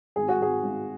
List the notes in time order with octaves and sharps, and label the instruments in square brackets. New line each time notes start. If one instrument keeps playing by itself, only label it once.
[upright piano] G#1 G#4
F#4
G#1 G#4
G#1